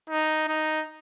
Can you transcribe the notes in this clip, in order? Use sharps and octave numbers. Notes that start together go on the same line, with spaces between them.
D#4
D#4